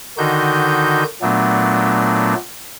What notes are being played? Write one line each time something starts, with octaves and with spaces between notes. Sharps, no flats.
D3 D#3 D#4 F#4 G6
A#2 F#3 A3 B3 D4